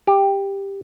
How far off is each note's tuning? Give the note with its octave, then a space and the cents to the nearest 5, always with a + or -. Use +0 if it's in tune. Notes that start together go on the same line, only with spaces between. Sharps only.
G4 +10